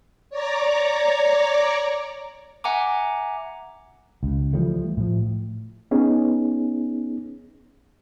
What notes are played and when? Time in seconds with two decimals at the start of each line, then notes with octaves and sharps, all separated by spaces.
0.30 C#5 D5 A#5 D6
2.64 E5 F#5 G#5 A#5 D6
4.23 C#2
4.53 E3 F3 G3 A3
4.97 A2 F3
5.91 B3 C#4 D#4 G#4